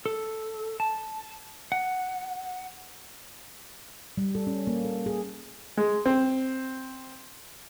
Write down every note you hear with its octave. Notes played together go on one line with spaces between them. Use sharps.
A4
A5
F#5
G3
A4
C#4
A#3
A4
G#4
G#3
C4